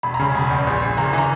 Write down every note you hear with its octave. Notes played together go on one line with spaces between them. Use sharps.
E1 B5
A#5
C#3 B5
E1
E2
A#1
A#1
F#1 A#5
E3 A#5